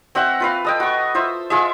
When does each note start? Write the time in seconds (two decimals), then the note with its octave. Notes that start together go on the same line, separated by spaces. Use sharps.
0.15 C4 F#4 E5 F#5
0.40 F4 B4 F5
0.65 A4 D#5 G5
0.80 F#4 C#6
1.14 F4 C5 E5
1.50 G#3 F4 G#4 E5